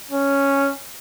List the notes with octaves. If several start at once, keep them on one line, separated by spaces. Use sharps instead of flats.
C#4